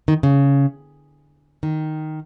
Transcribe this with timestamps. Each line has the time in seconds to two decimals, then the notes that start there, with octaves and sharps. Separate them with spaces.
0.08 D#3
0.23 C#3
1.63 D#3